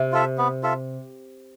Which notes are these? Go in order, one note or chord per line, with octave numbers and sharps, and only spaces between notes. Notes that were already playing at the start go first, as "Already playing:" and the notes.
Already playing: C3
F4 A4 E5
B3
F4 A4 E5